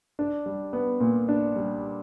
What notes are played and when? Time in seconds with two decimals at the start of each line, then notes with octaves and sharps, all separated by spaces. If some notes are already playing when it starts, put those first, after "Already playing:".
0.19 D4
0.46 G3
0.73 B3
1.00 A#2
1.29 D4
1.56 G3